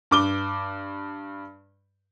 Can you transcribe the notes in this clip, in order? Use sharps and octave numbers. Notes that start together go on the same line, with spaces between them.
G2 D6 G7